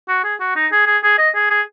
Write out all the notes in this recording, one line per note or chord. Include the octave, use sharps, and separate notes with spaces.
F#4
G#4
F#4
D#4
G#4
G#4
G#4
D#5
G#4
G#4